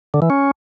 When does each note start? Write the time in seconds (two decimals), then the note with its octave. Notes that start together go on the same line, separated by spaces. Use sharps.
0.14 D3
0.22 E3
0.30 C#4